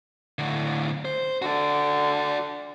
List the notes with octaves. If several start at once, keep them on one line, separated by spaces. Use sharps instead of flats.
A2 D3
C5
D3 F#4 D5